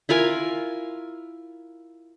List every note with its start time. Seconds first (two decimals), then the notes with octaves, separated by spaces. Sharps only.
0.09 E4 F4 A#4 G#5